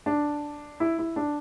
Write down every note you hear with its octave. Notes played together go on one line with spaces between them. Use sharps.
D4
E4
E4
D4